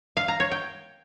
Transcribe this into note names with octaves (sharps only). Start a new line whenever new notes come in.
F5
A#5
C#5
G5